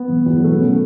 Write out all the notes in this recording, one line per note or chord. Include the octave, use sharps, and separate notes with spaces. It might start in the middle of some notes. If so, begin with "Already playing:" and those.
Already playing: B3
E1
E2 B2 F#3
E1 A3
B3
B2 F#3 C#4
A3